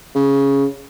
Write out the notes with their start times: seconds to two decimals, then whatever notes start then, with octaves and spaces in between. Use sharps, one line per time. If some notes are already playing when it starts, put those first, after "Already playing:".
0.15 C#3